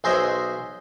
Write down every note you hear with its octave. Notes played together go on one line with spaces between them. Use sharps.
B1 G#4 C5 D#5 E5